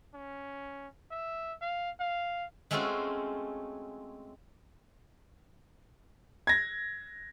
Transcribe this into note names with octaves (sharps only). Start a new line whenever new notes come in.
C#4
E5
F5
F5
G#3 A3 C4 C#4 F4 F#4
G#6 A#6